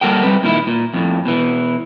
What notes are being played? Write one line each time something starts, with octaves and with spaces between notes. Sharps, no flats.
G3 A#3 F#4 A4 G5
G3 C4 B4
A#2 D#3 E4
A#2
F2 A2
B2 E3